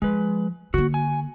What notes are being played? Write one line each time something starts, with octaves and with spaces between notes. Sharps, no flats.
F3 G#3 B4
D3 A#3 F#4
G#5